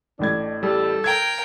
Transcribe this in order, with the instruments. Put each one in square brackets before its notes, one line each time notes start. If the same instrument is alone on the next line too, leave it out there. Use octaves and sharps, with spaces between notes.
[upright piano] A1 A2 G#6 [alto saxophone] D4
[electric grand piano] G3 [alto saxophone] A4
[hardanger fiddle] A#4 G5 [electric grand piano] G#6